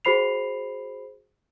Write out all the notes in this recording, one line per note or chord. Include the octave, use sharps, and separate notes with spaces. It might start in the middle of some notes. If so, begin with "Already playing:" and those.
F#4 G#4 C5 B5 C7 F7